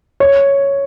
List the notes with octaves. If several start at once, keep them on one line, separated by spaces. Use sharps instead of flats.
C#5